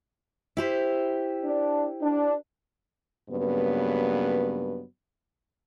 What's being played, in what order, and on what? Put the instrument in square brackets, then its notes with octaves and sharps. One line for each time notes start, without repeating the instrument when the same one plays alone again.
[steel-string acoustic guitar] E4 G4 C5
[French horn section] D4
D4
G2 C#3 F#3 A#3 B3 B4